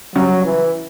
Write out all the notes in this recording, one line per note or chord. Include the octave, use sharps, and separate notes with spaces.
C#3 F#3 G3 C#4 F#4
E3